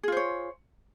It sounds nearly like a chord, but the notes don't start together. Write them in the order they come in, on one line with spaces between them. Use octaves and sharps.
G#4 F4 C5 C#5